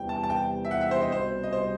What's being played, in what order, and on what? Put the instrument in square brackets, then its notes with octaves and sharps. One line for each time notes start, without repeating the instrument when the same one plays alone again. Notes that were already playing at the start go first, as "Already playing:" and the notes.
Already playing: [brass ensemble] E2 C3 E3 G3 [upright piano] G5
[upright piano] A5
A5
G5
E5
F#5
E5
C5
D#5
[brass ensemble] C2 B2 G3 C4 [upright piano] C5
[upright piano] D#5
C5